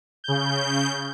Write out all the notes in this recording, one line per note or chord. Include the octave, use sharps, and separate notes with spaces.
C#3 G6